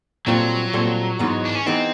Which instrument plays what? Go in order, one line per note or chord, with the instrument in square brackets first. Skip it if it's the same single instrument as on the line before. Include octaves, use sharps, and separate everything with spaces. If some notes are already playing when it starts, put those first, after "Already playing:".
[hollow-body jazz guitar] A#2 G3 C4 F4 A4 [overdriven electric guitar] F#3
[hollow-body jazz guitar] A#2 G3 C4 F4 A4
G#2 E3 G#3 B3 D#4
[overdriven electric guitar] D4
C#4
[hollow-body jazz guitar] E3 G#3 B3 D#4 [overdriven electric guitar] C4